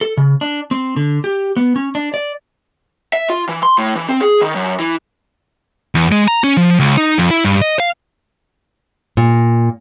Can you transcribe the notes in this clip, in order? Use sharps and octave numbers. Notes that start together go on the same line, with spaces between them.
A4
C#3
D4
C4
D3
G4
B3
C#4
D4
D5
E5
F4
E3
C6
A2
E3
C4
G#4
D#3
F#2
E3
E2
G#3
A#5
C#4
F3
C#2
D#4
F2
E4
G2
D#5
F5
A#2